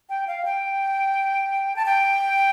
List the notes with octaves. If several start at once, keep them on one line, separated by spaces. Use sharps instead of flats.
G5
F5
G5
A5
G5